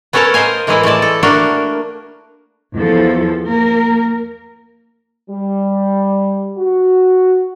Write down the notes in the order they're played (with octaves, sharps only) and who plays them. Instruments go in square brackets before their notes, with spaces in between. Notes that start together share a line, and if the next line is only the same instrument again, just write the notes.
[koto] B3 C#4 A4 A#4 C#5 A5
A#4 C5 D#5 F5 G#5
A2 E3 G#3 A#3 E4
G#3 A3 E4 D5 A5
A4
A3 A#3 D4 F#4 A#4
[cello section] E2 F3 A4
A#3 A#4
[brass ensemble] G3
F#4